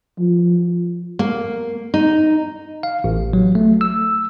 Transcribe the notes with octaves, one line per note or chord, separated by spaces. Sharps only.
F3
A#3
D#4
F5
A1
F#3
A3
E6